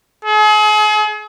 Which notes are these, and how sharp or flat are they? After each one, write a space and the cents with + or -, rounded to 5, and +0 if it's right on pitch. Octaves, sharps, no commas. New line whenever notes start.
G#4 +40